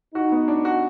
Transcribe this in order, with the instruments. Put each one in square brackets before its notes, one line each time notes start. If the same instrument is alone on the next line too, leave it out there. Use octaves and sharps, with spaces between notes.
[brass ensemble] D#4 [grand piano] F#4
[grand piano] B3
D4
F#4